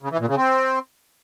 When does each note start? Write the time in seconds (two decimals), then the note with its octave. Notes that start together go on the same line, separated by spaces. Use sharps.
0.02 C#3
0.11 E3
0.20 A#2
0.28 C#3
0.37 C4